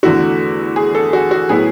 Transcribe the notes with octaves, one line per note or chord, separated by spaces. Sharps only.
E2 D3 A3 E4 F#4
G#4
A4
F#4
F#4
A2 F#3 B3 E4 G#4